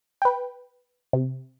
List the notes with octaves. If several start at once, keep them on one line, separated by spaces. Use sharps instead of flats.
B4 G5
C3